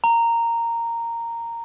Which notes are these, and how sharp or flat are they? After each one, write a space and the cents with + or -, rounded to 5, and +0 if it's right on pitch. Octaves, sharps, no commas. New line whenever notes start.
A#5 -10